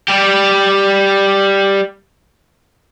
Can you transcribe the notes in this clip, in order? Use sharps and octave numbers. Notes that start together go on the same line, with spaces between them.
G3 G4